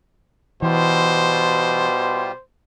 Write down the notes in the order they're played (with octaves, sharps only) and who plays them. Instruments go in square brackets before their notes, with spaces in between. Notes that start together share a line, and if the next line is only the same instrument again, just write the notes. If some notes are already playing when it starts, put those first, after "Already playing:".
[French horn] B2 [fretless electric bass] E3 [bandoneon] G3 F4 G4 [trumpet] C5